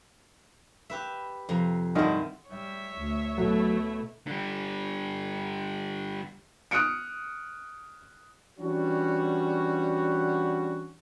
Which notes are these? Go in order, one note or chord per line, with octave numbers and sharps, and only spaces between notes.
G4 B4 E5
F2 C3 A#5
G2 D3 D#3 E4 D#5
G3 C#5 E5
D2
B2 F#3 A3 E4
D3 G3
D#6 F6 F#6 C#7 D7
E3 G3 C#4 D4 F#4